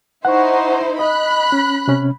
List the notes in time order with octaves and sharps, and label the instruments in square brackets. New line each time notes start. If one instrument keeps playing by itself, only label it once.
[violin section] D#4 E4 C5 [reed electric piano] F#5 C#6
[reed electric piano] D#5 [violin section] B5 F#6
[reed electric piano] C#4
C3 C#4